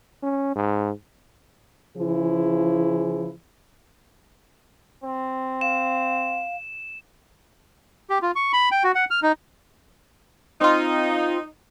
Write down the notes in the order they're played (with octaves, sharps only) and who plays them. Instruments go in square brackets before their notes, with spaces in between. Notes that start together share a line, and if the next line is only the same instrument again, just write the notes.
[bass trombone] C#4
G#2
[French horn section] C#3 E3 F3 E4 G#4
[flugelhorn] C4
[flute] F5 [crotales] E7
[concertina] G4
F4
C#6
B5
G5
F#4
F#5
F6
D#4
[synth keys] C4 F4 [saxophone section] D#4